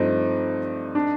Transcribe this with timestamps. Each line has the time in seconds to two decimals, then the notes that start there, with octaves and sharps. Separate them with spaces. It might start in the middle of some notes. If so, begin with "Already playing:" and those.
Already playing: G2 F3 A3 C4 D#4
0.95 D4